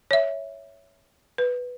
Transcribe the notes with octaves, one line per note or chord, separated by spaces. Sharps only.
C#5 E5
B4